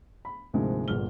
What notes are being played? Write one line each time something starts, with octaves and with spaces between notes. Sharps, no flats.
B5
D2 G#2 C3 F3 G#3 A#3
G1 G2 A#2 G#4 F6 G7